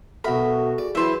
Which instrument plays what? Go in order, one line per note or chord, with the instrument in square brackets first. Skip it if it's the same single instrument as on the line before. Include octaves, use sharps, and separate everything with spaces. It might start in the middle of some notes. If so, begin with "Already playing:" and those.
[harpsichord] B1 A#4 [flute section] F#4 [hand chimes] A4 E5 F#5 [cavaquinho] B5
[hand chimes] G#4 [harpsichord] D5
[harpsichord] E3 F#3 [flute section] E4 [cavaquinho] C5 E5